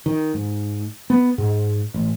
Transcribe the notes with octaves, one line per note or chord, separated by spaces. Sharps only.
D#3
G#2
B3
G#2
A1